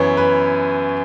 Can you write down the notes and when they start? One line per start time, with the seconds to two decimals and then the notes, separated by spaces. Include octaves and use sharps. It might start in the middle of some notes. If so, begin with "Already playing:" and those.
Already playing: F#2 E3 B3 E4 C#5
0.17 B4